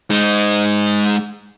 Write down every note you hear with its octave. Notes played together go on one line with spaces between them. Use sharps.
G#3 D#4